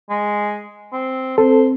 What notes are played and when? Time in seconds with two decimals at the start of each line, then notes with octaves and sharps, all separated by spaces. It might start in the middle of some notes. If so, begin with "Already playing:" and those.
0.10 G#3
0.93 C4
1.38 C4 A4 C5